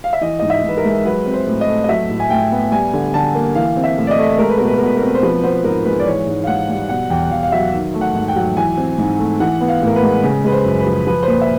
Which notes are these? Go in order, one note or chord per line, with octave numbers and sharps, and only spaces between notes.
F5
E5
E3 D#5
G#2 D#5
E5
G#2
B4
A#4
G#3
F#3 B4
C4
C5
A2
D#5
A3
D#5
F#3 E5
A2
G#5
A2 G5
B3
G3 G#5
D3
D3 A5
A#3
E3 F5
C4
E5
A2
D5
D#5
A3
G#3 A#4
B4
B2 A#4
B4
B2 A#4
B4
A#4
C4
C5
F3 B4
B3 C5
G#2 A#4
G#3 B4
D5
E3 C#5
G#2
F5
G#2 F#5
G3
B2 F#5
E2 G5
E2 F5
F5
F#3 E5
D#3
A3
F#5
G#2
G5
F#3
E3 G#5
C4
G#2
A3
E3 F#5
B3
F5
A2
A#4
B4
G#3
C#3
G#3 B4
C5
F#2
B4
F3
F3 B4
C5
A#2 B4
E5